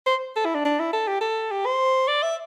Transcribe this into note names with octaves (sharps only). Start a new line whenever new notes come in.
C5
A4
E4
D4
D4
E4
A4
G4
A4
G4
C5
D5
E5